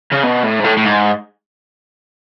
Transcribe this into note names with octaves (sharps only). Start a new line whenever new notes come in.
C#3
B2
A2
G#2
A2
A2
G#2